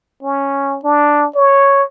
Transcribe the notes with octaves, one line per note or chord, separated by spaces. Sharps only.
C#4
D4
C#5